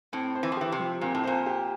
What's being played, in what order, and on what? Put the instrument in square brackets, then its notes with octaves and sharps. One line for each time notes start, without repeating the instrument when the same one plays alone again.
[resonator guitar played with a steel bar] A2 [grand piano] C4
[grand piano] C5
[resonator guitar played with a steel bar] E3
F3
[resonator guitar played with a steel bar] E3 [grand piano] G4
[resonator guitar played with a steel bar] C3
[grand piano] F3
[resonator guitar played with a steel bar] A#2 [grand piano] C4
[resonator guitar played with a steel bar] A2
[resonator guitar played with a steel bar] A#2 [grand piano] C5
[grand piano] G4